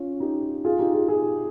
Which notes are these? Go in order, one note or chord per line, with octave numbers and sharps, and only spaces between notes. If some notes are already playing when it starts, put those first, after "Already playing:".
Already playing: C#4 F4
D#4 G4
F4 G#4
D#4 G4
F4 G#4
F4 G#4